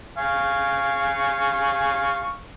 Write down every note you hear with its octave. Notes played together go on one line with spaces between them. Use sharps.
F5 G#5 C#6